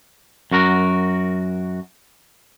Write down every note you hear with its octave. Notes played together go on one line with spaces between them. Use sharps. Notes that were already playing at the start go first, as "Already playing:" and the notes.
F#2 F#4 A#4